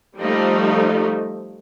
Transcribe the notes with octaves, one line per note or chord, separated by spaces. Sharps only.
F3 G3 A3 D#4